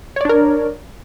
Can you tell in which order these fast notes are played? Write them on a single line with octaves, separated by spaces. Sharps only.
C#5 D5 D4 A#4